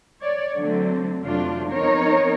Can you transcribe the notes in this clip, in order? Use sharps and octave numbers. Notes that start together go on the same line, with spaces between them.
C#5 D5
D3 F#3 A3 C4
F2 C3 F#3 A3 D4 F4
F3 B3 C4 D#4 A#4 C#5